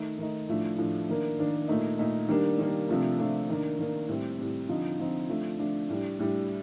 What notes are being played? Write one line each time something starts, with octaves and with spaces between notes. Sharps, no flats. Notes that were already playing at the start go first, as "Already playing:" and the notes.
Already playing: D#3 A3 D#4
D#3 A3 D#4
A2 F3 A3 D4
A2 F3 A3 D4
D#3 A#3 D4
D#3 A#3 D4
A#2 A3 D#4
A#2 A3 D#4
D#3 G3 A#3 D4
D#3 G3 A#3 D4
C3 F3 A3 D4
C3 F3 A3 D4
D#3 A#3 D4
D#3 A#3 D4
A2 G3 C4
A2 G3 C4
D3 F3 C4 D#4
D3 F3 C4 D#4
F3 A3 D4
F3 A3 D4
A2 G3 D4
A2 G3 D4